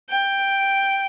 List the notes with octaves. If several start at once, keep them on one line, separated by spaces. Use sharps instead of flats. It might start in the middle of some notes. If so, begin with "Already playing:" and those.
G5